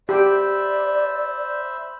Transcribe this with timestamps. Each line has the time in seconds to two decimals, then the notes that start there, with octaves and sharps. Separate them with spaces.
0.09 G4 C5 D5 E5 B5